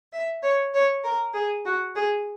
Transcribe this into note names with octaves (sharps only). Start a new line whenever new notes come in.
E5
C#5
C#5
A#4
G#4
F#4
G#4